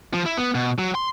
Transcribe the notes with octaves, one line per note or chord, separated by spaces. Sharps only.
F3
E4
B3
B2
F#3
C6